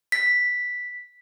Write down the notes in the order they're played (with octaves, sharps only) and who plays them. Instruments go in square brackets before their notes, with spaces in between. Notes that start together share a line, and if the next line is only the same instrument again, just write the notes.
[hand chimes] B6